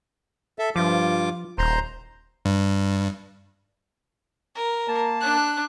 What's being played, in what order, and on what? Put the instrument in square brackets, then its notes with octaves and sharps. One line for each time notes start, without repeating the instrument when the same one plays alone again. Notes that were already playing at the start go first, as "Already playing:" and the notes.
[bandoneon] A4 E5
[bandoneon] G2 F4 D6 [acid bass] F3
[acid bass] D#1 [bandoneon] C5 A#5 C6
[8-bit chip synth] G2
[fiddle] A#4
[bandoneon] A#3 A5
[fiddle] D4 F#6